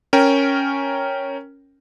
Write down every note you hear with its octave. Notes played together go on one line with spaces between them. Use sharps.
C#4 A#4 G5